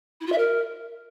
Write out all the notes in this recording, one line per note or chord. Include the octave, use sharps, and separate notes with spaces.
E4
F4
E5
A#4